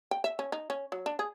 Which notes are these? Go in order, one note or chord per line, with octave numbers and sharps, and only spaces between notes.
G5
E5
C#4
D#4
C#4
F#3
D4
G#4